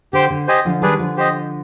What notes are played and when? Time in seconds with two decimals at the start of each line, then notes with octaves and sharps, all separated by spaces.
0.13 D3 G4 C5 G5
0.30 D3
0.48 G4 C5 D#5 G#5
0.65 D3 F3
0.82 D#3 G3 D4 G#4 B4
0.99 D3 F3
1.17 G4 C5 D#5